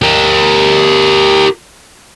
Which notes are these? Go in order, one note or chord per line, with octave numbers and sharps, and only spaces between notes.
G4 A#4